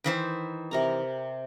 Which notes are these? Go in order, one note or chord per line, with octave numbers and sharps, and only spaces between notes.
D#3 E3 C5
C3 A#4 A#5